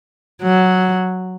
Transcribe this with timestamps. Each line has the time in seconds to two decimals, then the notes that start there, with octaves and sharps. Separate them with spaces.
0.42 F#3